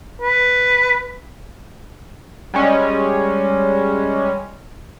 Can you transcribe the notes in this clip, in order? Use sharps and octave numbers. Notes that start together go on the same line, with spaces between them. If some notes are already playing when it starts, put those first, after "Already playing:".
B4
G3 G#3 C#4